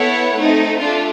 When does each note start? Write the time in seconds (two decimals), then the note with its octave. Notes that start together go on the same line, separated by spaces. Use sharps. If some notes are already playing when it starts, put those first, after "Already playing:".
Already playing: B3 E4 A4 C#5 F#5
0.35 A3 C4 D#4
0.79 A3 D4 F4